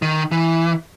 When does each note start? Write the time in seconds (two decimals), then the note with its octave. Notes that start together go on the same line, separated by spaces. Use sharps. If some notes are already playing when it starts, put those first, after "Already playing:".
0.02 D#3
0.31 E3